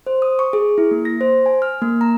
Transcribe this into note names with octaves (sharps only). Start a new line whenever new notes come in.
C5
D#6
C#6
G#4
E4
A#3
A#6
C5
G#5
F6
A#3
A#5